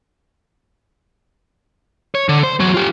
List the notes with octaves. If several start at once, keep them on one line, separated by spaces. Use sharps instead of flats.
C#5
D3
C5
E2 F#3
F4 G4